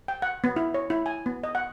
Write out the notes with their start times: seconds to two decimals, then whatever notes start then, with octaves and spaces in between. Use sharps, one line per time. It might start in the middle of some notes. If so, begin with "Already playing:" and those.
0.08 G5
0.22 F#5
0.44 B3
0.56 E4
0.74 C#5
0.90 E4
1.06 G#5
1.26 B3
1.44 D#5
1.55 F#5